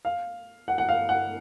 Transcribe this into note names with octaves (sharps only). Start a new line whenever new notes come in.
F5
F#5
F#5
F5
F#5